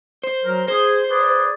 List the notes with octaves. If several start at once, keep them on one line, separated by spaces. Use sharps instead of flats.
C5
F#3 F#4 A#4
G#4 C5
G#4 B4 D5